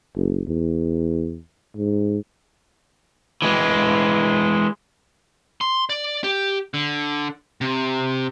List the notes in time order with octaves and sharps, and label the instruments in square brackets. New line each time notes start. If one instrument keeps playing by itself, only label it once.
[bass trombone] F#1
E2
G#2
[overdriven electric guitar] E3 G#3
[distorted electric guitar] C6
D5
G4
D3
C3